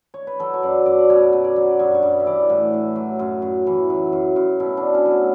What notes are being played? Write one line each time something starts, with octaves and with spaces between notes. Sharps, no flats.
C#5
B4
F#3 A4
C#5
F#2 D5
F#2 D5
D5
B2 C#5
B2
D5
F#3
D5
G2 C#5
C#5
G2 D5
E5
E3 D5
A2 F#4
A2
F#3
F#2
F#2
E3
F#3
F#2
F#2
B2 E4
D4
B2
C#4
F#3
A3